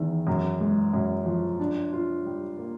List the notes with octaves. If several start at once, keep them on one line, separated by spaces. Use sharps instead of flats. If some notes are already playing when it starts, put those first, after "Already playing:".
Already playing: E2 D#3
F#2
G#3
F#2
F3
D4
F4
G3
A#3